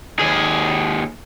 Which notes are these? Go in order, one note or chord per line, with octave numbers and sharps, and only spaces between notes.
D#2 G#4